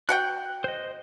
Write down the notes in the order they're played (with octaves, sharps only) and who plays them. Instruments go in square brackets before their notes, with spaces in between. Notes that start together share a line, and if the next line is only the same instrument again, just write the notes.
[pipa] F#4 F#5 G5 [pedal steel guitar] F#6
[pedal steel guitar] C5 D#5